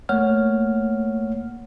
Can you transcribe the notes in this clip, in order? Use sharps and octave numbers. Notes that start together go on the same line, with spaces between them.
A3 A#3 C#5 F#5 F6